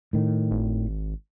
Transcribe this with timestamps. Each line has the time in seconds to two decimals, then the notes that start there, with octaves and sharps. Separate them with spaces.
0.13 A2 D#3
0.51 G#1